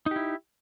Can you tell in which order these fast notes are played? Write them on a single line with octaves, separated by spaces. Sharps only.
D#4 G4 E4